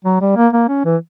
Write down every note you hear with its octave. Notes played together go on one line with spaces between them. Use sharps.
F#3
G3
A#3
A#3
C#4
E3